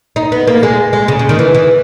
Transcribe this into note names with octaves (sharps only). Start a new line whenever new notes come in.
D#4
B3
A#3
G#3
G#3
C#3
C#3
D#3
E3
E3